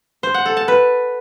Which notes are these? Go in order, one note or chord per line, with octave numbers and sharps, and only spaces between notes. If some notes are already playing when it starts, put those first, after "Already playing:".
C5
F#5
A4
A5
B4